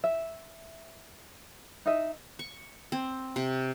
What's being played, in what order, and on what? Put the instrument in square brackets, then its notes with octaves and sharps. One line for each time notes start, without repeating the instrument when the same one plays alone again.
[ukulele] E5
D#4 D#5 E5
[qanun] C#6
C4
C3